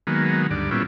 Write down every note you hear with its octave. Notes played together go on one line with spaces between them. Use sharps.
D#3 F#3 G#3 A#3 B3
D2 G2 D5
A#2 G3 B3 C#4 E4 F4